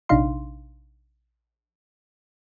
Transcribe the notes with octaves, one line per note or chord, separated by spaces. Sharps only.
A#1 C3 D4 D#4 F5 C6